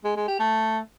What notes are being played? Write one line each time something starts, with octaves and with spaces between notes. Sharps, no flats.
G#3
G#3
G4
A3